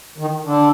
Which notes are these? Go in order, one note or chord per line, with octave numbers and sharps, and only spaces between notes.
D#3
D3